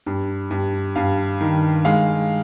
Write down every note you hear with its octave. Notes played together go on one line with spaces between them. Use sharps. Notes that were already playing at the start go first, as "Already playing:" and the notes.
G2
G2
G2 F5
D#3
G#3 F5